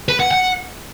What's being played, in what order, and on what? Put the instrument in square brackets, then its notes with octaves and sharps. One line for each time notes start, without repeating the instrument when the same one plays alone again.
[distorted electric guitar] B4
F#5
F#5